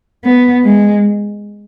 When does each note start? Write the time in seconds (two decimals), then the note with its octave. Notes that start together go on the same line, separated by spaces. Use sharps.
0.25 B3
0.65 G#3